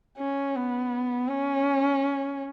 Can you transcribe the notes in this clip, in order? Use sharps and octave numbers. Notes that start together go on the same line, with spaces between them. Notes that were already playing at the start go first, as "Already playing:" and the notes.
C#4
B3
C#4